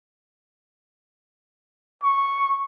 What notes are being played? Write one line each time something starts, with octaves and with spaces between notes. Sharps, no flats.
C#6